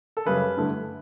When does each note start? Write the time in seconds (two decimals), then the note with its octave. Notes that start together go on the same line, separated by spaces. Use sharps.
0.17 A4
0.26 F#2 C#3 G3 B4
0.57 G2 D3 A3 E4